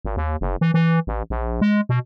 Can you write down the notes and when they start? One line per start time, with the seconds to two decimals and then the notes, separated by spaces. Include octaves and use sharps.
0.05 G#1
0.17 D#2
0.41 F#1
0.61 E3
0.74 E3
1.07 A1
1.30 A#1
1.61 G#3
1.89 B2